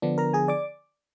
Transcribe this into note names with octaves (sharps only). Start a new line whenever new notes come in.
D3 F3 B3 D4
A#4 A#5
G#4 G#5
D5 D6